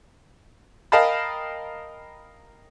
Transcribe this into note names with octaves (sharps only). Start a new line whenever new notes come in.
A#4 D#5 F5 G5 A5 B5